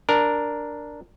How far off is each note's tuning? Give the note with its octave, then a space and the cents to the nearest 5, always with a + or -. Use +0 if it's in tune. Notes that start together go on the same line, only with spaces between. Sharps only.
D4 +0 A#4 +0